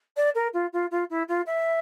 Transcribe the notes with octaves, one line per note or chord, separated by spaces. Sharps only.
D5
A#4
F4
F4
F4
E4
F4
E5